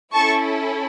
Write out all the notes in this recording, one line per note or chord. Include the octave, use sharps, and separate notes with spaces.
C#4 E4 A4 A5 C#6